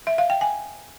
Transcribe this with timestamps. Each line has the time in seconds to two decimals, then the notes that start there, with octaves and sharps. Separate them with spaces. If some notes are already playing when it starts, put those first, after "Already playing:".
0.07 E5
0.18 F5
0.30 G5
0.41 G#5